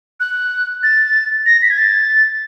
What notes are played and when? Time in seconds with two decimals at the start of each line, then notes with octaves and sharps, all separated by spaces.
0.20 F#6
0.83 A6
1.46 A#6
1.62 B6
1.70 G#6
1.78 A6